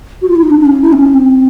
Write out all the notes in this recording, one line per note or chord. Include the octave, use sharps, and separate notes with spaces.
F#4
F4
E4
D#4
D4
D4
C#4
E4
C4
C#4
C4